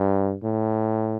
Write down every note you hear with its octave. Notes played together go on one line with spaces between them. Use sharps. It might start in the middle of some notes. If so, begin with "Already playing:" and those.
Already playing: G2
A2